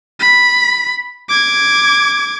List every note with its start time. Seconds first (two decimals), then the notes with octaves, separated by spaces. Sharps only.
0.19 B5
1.29 D6 G#6